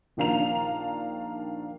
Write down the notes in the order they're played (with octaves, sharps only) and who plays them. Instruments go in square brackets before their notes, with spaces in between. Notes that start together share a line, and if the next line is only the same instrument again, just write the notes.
[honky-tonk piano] A#1 D#3 D4 F5 A#5 F7